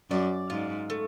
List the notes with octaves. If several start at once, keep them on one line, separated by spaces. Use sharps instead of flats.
F#2 D5
G#2 F4
A3